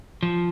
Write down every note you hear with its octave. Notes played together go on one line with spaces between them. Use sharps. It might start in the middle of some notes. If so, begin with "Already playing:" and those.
F3